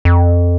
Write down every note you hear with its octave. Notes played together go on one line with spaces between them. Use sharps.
F2